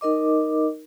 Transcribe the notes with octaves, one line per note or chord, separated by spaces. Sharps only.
D#4 A#4 D#5 D6